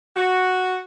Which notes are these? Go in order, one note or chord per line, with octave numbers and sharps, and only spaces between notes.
F#4